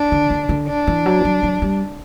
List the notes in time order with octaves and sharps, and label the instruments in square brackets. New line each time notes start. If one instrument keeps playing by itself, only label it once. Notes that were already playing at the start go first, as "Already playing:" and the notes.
Already playing: [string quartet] D4
[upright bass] D3
D3
D3
[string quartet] D4
[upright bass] E3
F#3
E3
F#3
F#3
G3